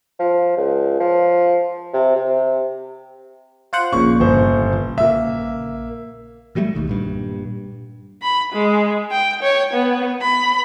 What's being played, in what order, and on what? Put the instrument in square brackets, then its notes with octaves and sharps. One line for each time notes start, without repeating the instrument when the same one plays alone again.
[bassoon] F3
C#2
F3
C3
C3
[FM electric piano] F4 C5 F#5
[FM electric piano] A#1 A#2 C#3 [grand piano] C#6
[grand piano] G1 C5
A#3 E5
[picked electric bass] E3 F#3 G3 A3
E1 B1 D#3
G2 A#2
[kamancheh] B5
G#3
G5
C#5
B3
B5